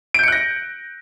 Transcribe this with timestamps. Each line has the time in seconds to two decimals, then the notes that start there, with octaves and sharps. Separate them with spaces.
0.14 D7
0.19 G6
0.23 C#7
0.28 F#6
0.32 A#6